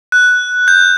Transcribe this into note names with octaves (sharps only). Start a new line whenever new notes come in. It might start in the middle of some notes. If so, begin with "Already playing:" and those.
F#6
G6